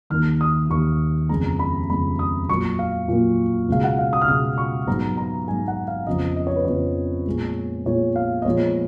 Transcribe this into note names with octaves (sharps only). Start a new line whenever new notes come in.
D#2 D#3 A#3 F6
D#6
D#2 D#3 A#3 C#6
F2 C#3 G#3 B3 A#5
B5
F2 C#3 G#3 B3 B5
D#6
A#2 F#3 A#3 C#6
F5
A#2 F#3 A#3
C#2 B2 G#3 F5
F#5
F5
D#6
F6
C#2 B2 G#3 D#6
C#6
G#2 F#3 B3 A#5
A#5
G#2 F#3 B3 G#5
F#5
F5
F2 C#3 F3 B3 D#5
D#5
C#5
B4
F2 C#3 F3 B3 C#5
A#2 G#3 B3
A#2 G#3 B3 C#5
F5
D#5
A#2 F3 G#3 B3 C#5